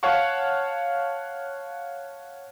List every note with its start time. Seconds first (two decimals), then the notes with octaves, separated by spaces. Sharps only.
0.03 C#5 F5 F#5 A5 C#6